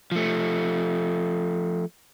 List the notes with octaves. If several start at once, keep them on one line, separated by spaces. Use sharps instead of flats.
F3 A3